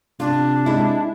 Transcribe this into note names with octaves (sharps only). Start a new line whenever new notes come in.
C3 D4 F4
G#3 E4